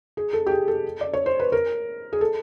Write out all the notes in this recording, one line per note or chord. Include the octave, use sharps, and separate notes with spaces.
G#4
A4
G4
G#4
A4
D5
C#5
C5
B4
A#4
G#4
A4